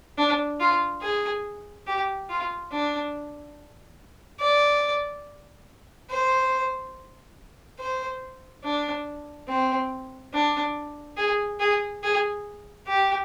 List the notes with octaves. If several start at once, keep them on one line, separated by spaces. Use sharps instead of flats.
D4
F4
G#4
G4
F4
D4
D5
C5
C5
D4
C4
D4
G#4
G#4
G#4
G4